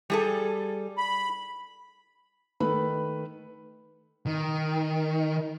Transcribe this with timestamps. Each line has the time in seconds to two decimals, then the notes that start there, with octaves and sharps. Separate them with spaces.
0.10 G3 G#4 A4
0.98 B5
2.60 D#3 A3 B4 B5
4.26 D#3